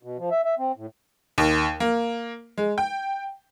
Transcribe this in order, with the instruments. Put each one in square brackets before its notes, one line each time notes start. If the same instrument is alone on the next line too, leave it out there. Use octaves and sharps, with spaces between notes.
[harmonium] B2
F3
E5
E5
C4
A2
[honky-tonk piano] D#2
A#3
G#3
G5